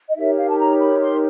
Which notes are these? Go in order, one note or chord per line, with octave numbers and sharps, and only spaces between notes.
D#5
D#4 G4 A#4 C#5 E5
F5
A5
A#5
B5
C6